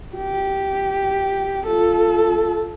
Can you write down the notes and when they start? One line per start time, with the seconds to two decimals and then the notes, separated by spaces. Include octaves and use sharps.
0.16 G4
1.67 F4 A4